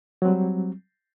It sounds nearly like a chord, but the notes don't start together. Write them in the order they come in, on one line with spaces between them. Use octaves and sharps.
F#3 C4 G3